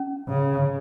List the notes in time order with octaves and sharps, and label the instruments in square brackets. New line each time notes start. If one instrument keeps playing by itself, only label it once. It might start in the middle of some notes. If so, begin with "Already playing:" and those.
Already playing: [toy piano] C#4
[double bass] C#3